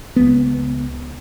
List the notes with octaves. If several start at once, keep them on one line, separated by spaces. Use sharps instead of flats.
C#2 B3